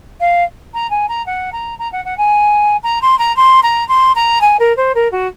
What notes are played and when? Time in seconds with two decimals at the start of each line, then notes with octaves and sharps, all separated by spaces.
0.20 F5
0.74 A#5
0.90 G#5
1.08 A#5
1.26 F#5
1.52 A#5
1.78 A#5
1.92 F#5
2.05 F#5
2.17 G#5
2.83 A#5
3.02 C6
3.19 A#5
3.36 C6
3.63 A#5
3.88 C6
4.15 A#5
4.41 G#5
4.59 A#4
4.76 C5
4.94 A#4
5.11 F#4